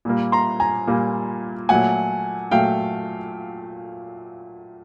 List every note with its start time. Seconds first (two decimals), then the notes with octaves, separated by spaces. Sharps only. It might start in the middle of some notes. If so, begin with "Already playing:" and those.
0.05 A#2 G3 A#3
0.32 A#5 C6
0.60 G#5 A#5
0.87 A#2 G3 A#3
1.69 A#2 F#3 A3 F#5 G#5
2.51 A#2 F#3 A3 F5 G5